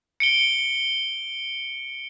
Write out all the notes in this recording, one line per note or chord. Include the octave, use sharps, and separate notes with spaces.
C#7 D7 G7